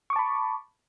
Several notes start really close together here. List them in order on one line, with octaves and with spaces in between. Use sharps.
C#6 D6 A5 B5